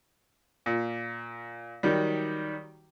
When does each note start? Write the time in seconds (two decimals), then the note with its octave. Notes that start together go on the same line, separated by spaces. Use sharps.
0.66 A#2
1.83 D#3 F#3 G3